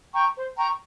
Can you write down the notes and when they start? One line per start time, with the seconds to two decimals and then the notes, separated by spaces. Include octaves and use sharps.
0.14 G5 A#5 C#6
0.36 C5
0.57 G5 A#5 C#6